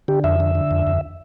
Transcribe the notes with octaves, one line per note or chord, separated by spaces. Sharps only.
D3 G4
F2 E5
D3
D3
F2
F2